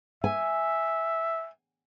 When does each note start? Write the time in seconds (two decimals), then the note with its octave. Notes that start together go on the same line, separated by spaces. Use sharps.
0.24 E5 G#5